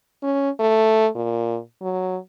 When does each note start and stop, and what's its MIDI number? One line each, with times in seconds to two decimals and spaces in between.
0.23 0.50 61
0.59 1.07 57
1.15 1.59 46
1.82 2.17 54